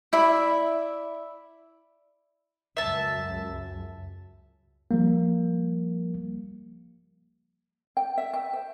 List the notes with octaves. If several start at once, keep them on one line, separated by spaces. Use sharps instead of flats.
E4 D5 E5 B5
C#2 F#2 E5 A5
F3 G3 A#3
G5
E5
G5
C5